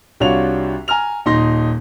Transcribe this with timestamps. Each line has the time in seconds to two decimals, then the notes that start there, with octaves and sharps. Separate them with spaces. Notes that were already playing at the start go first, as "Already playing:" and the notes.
0.20 C2 D4 F4 F#4 C#5 F7
0.88 G#5 A#5 F6 F7
1.26 D#1 D#4 C6 A#6